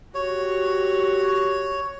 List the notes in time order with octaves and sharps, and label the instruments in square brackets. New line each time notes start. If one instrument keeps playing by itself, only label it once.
[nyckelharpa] F#4 G4 [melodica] C#5